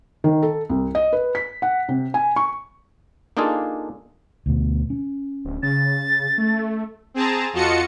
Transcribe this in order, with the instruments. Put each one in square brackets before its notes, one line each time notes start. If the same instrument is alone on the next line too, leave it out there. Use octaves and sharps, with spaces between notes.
[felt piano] D#3
A4
C2
D#5
B4
B6
F#5
C3
G#5
C#6
[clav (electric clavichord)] A#3 D4 D#4 F4 G#4 A4
[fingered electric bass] D2 B2
C#4
[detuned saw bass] D1
[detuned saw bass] C#3 [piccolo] A6
[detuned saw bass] A3
[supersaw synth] C4 G#4 A5 A#5
F2 F4 F#4 D#5 A5 C#7